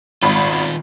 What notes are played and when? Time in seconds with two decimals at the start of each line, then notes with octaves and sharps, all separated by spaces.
0.23 G#1 D#3 F4 B5